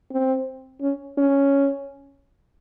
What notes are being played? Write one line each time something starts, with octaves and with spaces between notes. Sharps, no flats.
C4
C#4
C#4